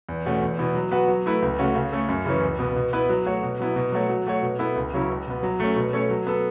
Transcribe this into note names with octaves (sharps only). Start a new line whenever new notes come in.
E2
B2 A3 C#4 F#4
E2
B2 B3 E4
F#3
B3 F#4 B4
F#3
A3 E4 B4
C#2
C#3 A3 C#4 F#4
C#3
A3 C#4 A4
F#2
C#3 E3 C#4
C#2
B2 B3
B2
B3 E4 B4
F#3
A3 F#4 C#5
B2
F#3 B3 E4
B2
F#3 A3 F#4 C#5
F#3
A3 F#4 C#5
B2
B3 E4 A4
C#2
C#3 F#3 C#4 E4
C#2
B2 B3
F#3
A3 C#4
B2
A3 C#4 A4 C#5
F#3
B3 A4